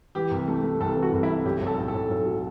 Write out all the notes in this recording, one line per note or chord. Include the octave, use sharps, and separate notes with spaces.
E3 G4
C2
A3
A3
C2 A4
E3
F#4
C2
E4
C3
B1 G4
B1
A4
A2
A4
B1
B1
F#3